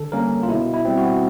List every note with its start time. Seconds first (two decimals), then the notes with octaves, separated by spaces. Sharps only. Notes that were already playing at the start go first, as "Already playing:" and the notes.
Already playing: D3 A4
0.12 G3 A#3 C#4 A#4
0.43 F4
0.48 B2 E4
0.74 E4
0.85 G3 C4
0.98 F#4